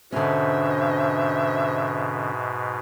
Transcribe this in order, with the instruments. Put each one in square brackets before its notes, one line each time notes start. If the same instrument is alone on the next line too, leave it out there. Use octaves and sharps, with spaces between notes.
[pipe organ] G#2 B2 [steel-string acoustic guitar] D3 C#4 [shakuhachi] C5 [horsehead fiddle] E5